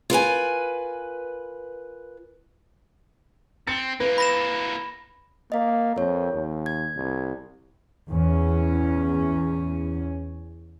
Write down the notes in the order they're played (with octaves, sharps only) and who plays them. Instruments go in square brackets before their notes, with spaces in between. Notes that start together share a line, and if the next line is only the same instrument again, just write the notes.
[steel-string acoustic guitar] F4 A#4 B4 G#5
[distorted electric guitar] C4 [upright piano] A6 C#7
[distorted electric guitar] E3 A#3 [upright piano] B4
[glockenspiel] B5 A#6 E7
[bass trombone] A#3 [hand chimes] D#5 F5
[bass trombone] F2 [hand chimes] A#4 C#5
[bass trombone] D#2
[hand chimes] G#6
[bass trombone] C2
[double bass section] E2 C#4